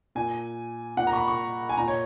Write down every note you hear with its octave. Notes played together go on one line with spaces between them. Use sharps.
A#2 G#5
A#2 F#5
A#5
C#6
B5
C#6
G#5
A#2 A#5
C#5